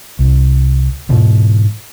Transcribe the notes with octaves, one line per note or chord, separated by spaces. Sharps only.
C2
G#2 B2 E3